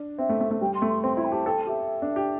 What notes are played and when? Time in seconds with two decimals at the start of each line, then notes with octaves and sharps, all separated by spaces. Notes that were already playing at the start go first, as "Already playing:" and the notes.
Already playing: D4
0.18 C4 E5
0.29 A3
0.41 A3
0.51 A3
0.61 G3 G5
0.75 C6
0.82 A3
0.89 C6
1.03 C4 C6
1.17 E4 C6
1.25 G5
1.32 G4 A5
1.46 A4 G5
1.67 G4 E5
2.02 D4
2.16 G4